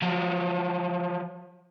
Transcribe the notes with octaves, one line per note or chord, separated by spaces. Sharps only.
F3 F#3